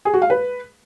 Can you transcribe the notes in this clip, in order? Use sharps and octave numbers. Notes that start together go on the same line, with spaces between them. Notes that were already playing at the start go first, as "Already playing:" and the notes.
G#4
F#4
F5
B4